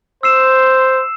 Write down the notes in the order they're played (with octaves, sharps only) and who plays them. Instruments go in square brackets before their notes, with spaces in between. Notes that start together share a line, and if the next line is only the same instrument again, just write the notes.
[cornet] C5 [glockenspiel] E6 C7 E7